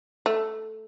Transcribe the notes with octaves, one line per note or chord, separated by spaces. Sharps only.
A3